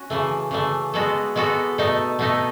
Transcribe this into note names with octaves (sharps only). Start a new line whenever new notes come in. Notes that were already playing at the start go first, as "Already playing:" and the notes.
Already playing: C#4 F#4
C#3 E3 A3
C#3 E3 A3
G#3 B3 F#4 A4
G#3 B3 F#4 A4
B2 A3 D#4 A4
B2 A3 D#4 A4